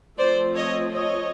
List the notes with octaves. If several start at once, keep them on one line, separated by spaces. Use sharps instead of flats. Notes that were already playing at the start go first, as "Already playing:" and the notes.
F3 A3 C4 C5 D5
C#5 D#5
C#5 D#5